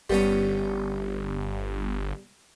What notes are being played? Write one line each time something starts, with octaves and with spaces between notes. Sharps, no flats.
G1 G3 B3 C#4